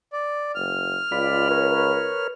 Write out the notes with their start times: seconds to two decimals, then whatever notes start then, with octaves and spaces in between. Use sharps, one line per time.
0.13 D5
0.55 F#1 F6
1.12 C#2 F4 D5 B5
1.51 A#4 B4 C#5